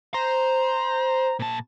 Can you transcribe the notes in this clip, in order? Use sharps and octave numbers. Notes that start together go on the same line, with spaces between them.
C5 A#5
A#2 A5